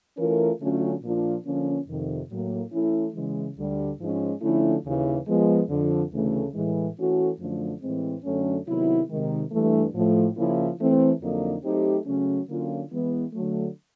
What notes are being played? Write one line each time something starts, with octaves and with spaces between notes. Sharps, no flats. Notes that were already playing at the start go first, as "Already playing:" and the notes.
E3 A3 C#4 F4 A#4
D3 F#3 A3 C#4 F4
A#2 F3 A#3 D4 F4
D3 F3 A#3 C#4
F2 C3 D#3
A2 F#3 A#3
E3 A3 C#4 E4
C#3 E3 G#3
D2 D3 G3
G#2 F3 G#3 C#4
D3 F3 A3 C#4 E4
D#2 C#3 E3
F3 G#3 B3
F2 D3 F3
D2 C#3 E3 A3
A2 E3 G#3
E3 A3 C#4 F#4 A4
F#2 D3 F3 A3
A2 E3 G#3 C4
F#2 D3 F#3 A3 C#4
C3 D#3 F#3 B3 E4
C3 D#3 G#3
G2 E3 A3
A2 F3 A3
C#3 F3 A#3 C#4 E4
E3 A3 C4
F2 D3 F#3 A#3 D#4
F#3 A3 C4 D#4 G4
C#3 F#3 A3 C#4
D3 F#3 A#3 C#4 F4
E3 G#3 B3
D3 F#3 A3